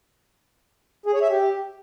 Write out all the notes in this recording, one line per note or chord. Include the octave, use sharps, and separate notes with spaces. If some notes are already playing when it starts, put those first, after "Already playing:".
G#4
C#5
E5
G4